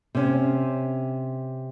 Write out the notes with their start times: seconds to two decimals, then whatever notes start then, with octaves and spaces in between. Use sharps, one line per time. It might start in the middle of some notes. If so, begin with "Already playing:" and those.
0.15 C3 C#4